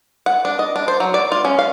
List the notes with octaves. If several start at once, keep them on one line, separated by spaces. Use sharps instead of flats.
F#5
D4
D#5
D4
C5
F#3
D5
F4
C#4
F5